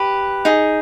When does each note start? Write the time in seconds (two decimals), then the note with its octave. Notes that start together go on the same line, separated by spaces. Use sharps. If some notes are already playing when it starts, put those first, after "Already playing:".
Already playing: G4 B4
0.45 D#4 G#4